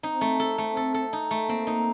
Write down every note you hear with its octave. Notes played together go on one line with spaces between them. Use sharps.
C4 D#4
A3
A4
A3
A4
A4
D#4
A3
A#3 C4
D#4